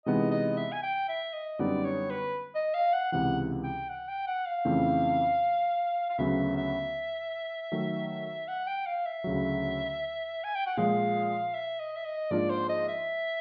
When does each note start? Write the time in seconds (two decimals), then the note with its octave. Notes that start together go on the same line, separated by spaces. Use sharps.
0.06 C3 E3 G#3 B3 D#4 D#5
0.31 D#5
0.57 E5
0.72 G#5
0.83 G5
1.09 E5
1.33 D#5
1.59 F#2 D3 G3 B3 D#4 D5
1.85 C#5
2.10 B4
2.55 D#5
2.74 F5
2.93 F#5
3.12 C#2 C3 E3 F#5
3.63 G5
3.89 F#5
4.08 G5
4.27 F#5
4.46 F5
4.65 F2 C#3 E3 A3 C4
6.10 F5
6.18 D2 C#3 F#3 B3 E5
6.57 E5
7.72 D#3 F#3 A3
8.48 F#5
8.67 G5
8.86 F5
9.05 E5
9.24 D2 C#3 F#3
10.44 G#5
10.55 G5
10.66 F#5
10.77 A#2 F3 G#3 F5
11.54 E5
11.80 D#5
11.96 E5
12.05 D#5
12.31 G#2 F3 A#3 D4 F4 D5
12.50 C5
12.69 D#5
12.88 E5